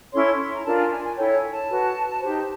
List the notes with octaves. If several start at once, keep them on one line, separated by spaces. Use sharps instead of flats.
C#4 E4 A4 C#5 C6
C6
A#5
D4 F4 A#4 A5
G#5
G#5
G#5
E4 A4 C#5 G5
G#5
A5
F#4 B4
D#4 G4 C5